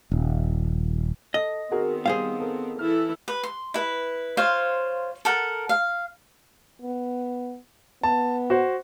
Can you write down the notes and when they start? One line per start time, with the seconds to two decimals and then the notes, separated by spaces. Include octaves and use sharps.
0.11 D#1
1.34 A4 D#5
1.71 D#3 B3 C4 F#4 G#4 A#4
2.06 G3 G#4 C5 F5
2.39 A4 A#4
2.79 E3 E4 A4 F6
3.28 B4
3.44 C6
3.74 E4 B4
4.37 F4 C5 C#5 F5
5.25 A4 A#4 F#5
5.69 F5
6.82 B3
8.03 B3 A5
8.50 F#4 C5